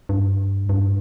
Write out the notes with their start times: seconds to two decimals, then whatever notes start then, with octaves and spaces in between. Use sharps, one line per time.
0.09 G2
0.69 G2